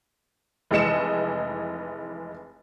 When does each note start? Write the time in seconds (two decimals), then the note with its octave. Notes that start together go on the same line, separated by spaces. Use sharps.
0.71 F1 E3 G#3 D#5 C#7 E7